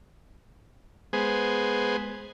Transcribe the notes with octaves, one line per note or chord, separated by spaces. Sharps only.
G#3 B3 G#4 C5